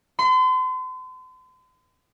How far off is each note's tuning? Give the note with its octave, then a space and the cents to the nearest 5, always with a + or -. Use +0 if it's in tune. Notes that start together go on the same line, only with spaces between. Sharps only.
C6 -40